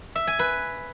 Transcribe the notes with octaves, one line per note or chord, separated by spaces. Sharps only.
E5
G#5
B4